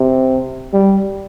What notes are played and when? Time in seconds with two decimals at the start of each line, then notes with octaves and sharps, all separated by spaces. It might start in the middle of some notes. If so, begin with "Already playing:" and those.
Already playing: C3
0.73 G3